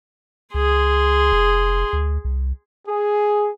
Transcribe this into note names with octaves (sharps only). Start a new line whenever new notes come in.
C#2 G#4 C6
F1
D2
C2
G#4